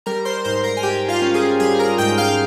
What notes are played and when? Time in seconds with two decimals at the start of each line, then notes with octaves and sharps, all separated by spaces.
0.06 G3 A#4 A#5
0.25 C5 C6
0.45 G#2 C5 C6
0.64 A#4 A#5
0.77 G#5
0.83 G#2 G4 G5
1.09 F4 F5
1.22 C#4
1.34 G#4 G#5
1.60 G3 G#4 G#5
1.79 A#4 A#5
1.98 G#2 G5 G6
2.18 F5 F6